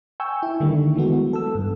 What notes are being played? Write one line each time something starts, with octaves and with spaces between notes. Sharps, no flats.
G5 G#5 C#6 E6 G6
E4
D3 D#3 G3 A3 A#3
E3 F#3 G#3 B3 F#4
A4 E6
G2